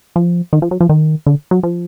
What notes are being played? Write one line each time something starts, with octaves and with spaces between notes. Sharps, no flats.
F3
D#3
F3
F#3
F3
D#3
D3
F#3
F3